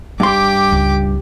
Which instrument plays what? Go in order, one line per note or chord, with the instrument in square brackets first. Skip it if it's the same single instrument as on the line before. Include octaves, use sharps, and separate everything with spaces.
[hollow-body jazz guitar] G2 C6 [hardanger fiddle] G4 D6
[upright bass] C#2